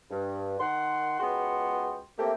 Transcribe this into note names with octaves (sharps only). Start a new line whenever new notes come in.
G2
D#3 F#5 C6
C#2 G#3 B3 F#4 G5 C6
A3 A#3 C4 G4 A4 E5